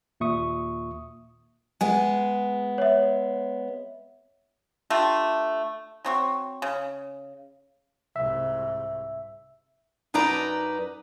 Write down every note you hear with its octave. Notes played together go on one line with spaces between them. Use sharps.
D#2 A#2 E5 C#6 D#6
G#3 B3 G#5
C#5 E5
A3 D4 F4 G4
F#3 C4 C#6
C#3
C2 G#2 E5
F#2 D#4 B4 D5 A#5